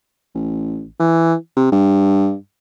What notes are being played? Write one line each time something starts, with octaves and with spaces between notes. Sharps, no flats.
A1
E3
C3
G2